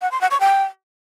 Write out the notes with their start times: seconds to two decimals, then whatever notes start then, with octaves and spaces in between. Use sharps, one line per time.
0.02 F#5
0.12 C6
0.21 F#5
0.31 C#6
0.40 G5